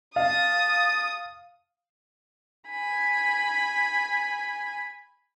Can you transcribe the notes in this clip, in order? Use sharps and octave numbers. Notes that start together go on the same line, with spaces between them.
F5 A5 D#6
G#5 B5